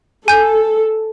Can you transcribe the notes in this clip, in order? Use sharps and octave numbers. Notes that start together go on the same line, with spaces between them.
A4 G#5 G6